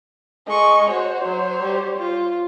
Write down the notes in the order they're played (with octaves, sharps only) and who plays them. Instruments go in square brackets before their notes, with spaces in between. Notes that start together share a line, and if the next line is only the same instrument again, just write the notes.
[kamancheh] G#3 C#6 [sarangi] D#5
[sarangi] F#4 [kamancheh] C5 C#5
[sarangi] F#3
G3
F4